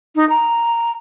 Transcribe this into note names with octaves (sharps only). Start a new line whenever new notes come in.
D#4
A#5